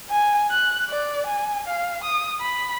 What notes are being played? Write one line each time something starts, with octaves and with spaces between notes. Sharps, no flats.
G#5
F#6
D5
G#5
F5
D#6
B5